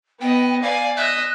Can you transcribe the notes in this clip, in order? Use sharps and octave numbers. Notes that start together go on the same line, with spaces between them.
B3 D#5 G5
D5 F5 G#5
D#5 E5 F#6